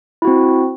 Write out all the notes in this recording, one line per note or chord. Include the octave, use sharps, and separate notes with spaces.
C4 E4 F#4